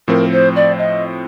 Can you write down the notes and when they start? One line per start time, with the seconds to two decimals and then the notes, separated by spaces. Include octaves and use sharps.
0.08 A2 F3 C4 A#4
0.32 C5
0.55 D5
0.78 D#5